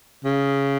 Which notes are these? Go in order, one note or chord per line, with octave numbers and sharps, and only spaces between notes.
C#3